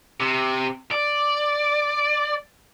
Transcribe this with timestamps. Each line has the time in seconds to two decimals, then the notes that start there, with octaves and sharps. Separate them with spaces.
0.20 C3
0.92 D5